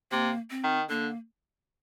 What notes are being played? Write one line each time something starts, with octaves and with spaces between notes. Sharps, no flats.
C3 A#3
C4
D#3
D3 A#3